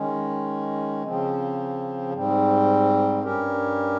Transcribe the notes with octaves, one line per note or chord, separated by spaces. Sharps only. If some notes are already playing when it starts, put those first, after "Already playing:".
Already playing: D#3 G#3 C#4
C#3 F3 C4
G#2 G3 C4
G2 G3 C#4 G4 A#4